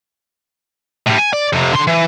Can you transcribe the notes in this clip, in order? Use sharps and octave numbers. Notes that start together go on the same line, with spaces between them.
A2 G3
G#5
D5
F2 C3
D3 C6
E3